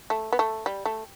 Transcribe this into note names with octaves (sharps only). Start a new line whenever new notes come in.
A3
B3
A3
G3
A3